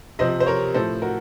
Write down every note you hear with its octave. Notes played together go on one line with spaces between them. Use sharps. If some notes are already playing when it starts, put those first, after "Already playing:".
C3 F3 C5 D#5
C5
A#4 C#5
A2 F3 A4 C5
F#4 A#4